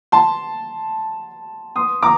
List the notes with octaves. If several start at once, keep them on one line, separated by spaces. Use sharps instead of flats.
A5 C6
C6 D#6
A#5 D6